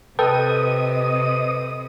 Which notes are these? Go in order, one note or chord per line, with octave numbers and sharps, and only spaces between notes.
C3 A4 B4 D#5 G5 D#6